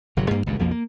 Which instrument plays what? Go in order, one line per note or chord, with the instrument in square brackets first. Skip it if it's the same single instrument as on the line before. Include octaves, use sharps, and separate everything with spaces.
[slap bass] G1 C3 F#3
G2 A#3
G#1 C#2 G2 A#2
B1 F2 F3 A#3
A#3